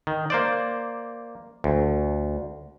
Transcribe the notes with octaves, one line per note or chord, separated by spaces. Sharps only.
D#3
A#3 C5 D5
D2